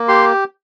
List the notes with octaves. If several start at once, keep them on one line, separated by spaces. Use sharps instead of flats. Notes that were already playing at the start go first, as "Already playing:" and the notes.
Already playing: A#3
G4 C6